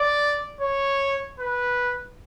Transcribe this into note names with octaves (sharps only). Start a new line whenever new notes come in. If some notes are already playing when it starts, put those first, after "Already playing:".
Already playing: D5
C#5
B4